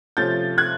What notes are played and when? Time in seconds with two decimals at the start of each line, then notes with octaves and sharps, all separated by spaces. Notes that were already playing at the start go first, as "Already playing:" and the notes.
0.17 C3 F3 A3 C#4 F4 G6 A6
0.58 F#6 G#6